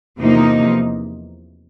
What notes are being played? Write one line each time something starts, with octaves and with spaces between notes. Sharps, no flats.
E2 C3 F3 A#3 D#4